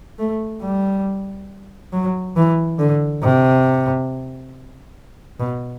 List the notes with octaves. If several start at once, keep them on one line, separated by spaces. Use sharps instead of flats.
A3
G3
F#3
E3
D3
C3
B2